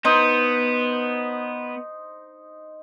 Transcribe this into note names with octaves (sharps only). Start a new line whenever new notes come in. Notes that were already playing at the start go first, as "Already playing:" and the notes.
B3 D#4 C5